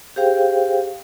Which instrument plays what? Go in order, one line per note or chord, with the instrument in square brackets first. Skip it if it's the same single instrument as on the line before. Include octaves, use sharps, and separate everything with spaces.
[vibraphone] G4 G#4 C5 F5 G5